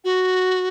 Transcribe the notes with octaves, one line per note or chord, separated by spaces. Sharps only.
F#4